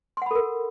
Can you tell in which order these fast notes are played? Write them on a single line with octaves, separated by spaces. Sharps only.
C6 F#5 B5 A4 A#4